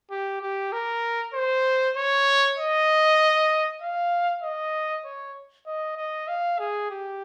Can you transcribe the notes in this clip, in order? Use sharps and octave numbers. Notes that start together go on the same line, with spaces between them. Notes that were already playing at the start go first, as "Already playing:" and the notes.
G4
G4
A#4
C5
C#5
D#5
F5
D#5
C#5
D#5
D#5
F5
G#4
G4